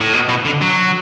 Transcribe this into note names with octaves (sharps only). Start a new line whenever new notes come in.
A2
B2
B2
D3
F#3